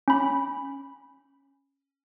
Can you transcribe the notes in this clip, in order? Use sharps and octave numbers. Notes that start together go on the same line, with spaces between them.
C#4 B5